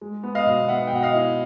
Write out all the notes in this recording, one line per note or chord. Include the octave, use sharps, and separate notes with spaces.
G#3
B3
D#5 F5
B2
B3 E5 F#5
G5
B2 F#5
D#5 F5
E4